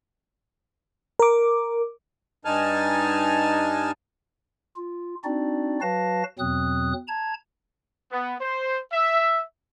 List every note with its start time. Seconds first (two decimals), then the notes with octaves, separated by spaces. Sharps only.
1.19 A#4 D6
2.45 G2 D#4 G#5 A5 F6
4.76 F4
5.24 C4 D4 D#4 F#4 D5
5.81 F#3 F#4 B4 F5 A5 A#6
6.39 E2 B2 F#3 C4 D#6 F#6
7.08 A5 A#5 G#6
8.12 B3
8.41 C5
8.92 E5